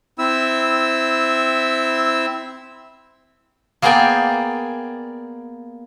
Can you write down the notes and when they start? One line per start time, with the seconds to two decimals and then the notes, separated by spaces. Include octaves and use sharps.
0.19 C4 E4 E6
3.82 A#3 B3 G#4 D5 G5 G#5